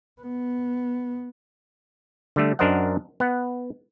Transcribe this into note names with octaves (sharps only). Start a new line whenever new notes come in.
B3
D3 G3 A3
F#2 D4 A#4 C5 D#5 F#5
B3 F#5